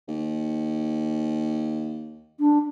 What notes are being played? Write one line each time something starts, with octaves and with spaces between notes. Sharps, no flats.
D#2
D4